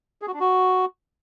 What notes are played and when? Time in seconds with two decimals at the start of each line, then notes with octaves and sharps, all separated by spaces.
0.22 G#4
0.28 F#4
0.34 D4
0.40 F#4